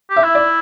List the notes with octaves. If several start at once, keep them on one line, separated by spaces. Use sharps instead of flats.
G4
E5
E4
D5